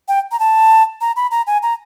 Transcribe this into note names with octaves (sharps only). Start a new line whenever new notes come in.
G5
A#5
A5
A#5
B5
A#5
G#5
A#5